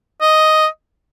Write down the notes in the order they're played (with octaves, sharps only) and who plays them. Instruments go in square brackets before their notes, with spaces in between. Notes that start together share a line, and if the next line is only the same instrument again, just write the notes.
[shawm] D#5